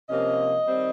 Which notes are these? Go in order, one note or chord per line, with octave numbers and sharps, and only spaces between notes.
C3 F3 A#3 C#4 D#5
D#3 G3 C4